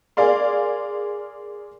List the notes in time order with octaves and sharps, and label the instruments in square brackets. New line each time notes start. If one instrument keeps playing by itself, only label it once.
[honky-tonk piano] G#4 A#4 D5 F5 C6